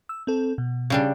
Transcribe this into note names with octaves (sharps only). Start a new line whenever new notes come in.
E6
C4 A4
B2
C#3 G3 D4